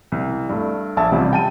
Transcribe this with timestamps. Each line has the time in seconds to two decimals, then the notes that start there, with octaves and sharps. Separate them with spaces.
0.12 C2
0.49 G2 A3
0.97 A#1 E5 A5
1.12 A1 C3 F3 G3
1.33 G5 A5 D#7